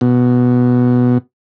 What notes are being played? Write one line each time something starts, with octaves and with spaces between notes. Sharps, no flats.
B2